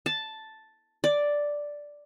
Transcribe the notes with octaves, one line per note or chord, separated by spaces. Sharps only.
A5
D5